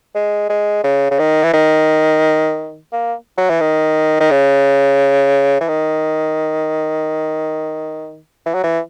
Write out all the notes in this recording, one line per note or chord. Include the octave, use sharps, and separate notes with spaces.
G#3
G#3
C#3
C#3
D#3
E3
D#3
A#3
F#3
E3
D#3
D#3
C#3
E3
D#3
E3
F#3
E3